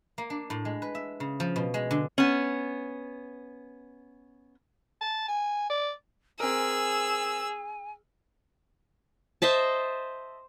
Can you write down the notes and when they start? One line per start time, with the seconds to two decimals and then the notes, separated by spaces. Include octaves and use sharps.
0.18 A#3
0.30 D4
0.50 A2
0.65 G#3
0.82 B4
0.95 E5
1.20 C#3
1.40 F3
1.56 B2
1.74 G#3
1.91 D3
2.18 B3 C#4
5.01 A5
5.28 G#5
5.70 D5
6.40 C4 G#4 A#4 G#5 E6
9.42 C5 D#5 E5 A5